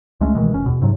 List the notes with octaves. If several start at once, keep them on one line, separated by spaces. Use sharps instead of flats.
C#2 G#3 A3 C#4
B2 D#3 E3 G#3
F1 C#4
E2 B2
G#2 C3 F#3